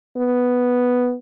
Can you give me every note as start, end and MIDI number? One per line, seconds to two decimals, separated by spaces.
0.17 1.15 59